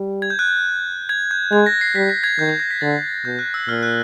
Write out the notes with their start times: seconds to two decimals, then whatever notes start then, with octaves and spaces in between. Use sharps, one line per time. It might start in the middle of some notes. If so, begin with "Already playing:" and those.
Already playing: G3
0.22 G#6
0.30 G6
0.39 F#6
0.48 G6
1.09 G#6
1.31 G6
1.51 G#3 G#6
1.66 A#6
1.81 C7
1.95 G3 B6
2.09 A#6
2.24 G#6
2.38 D#3 G6
2.49 G#6
2.60 A#6
2.71 B6
2.81 D3 A6
3.25 B2 G6
3.39 F#6
3.54 E6
3.67 A#2 F6
3.83 F#6